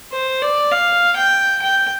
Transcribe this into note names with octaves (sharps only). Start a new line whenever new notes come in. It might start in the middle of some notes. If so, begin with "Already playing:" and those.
C5
D5
F5
G5
G5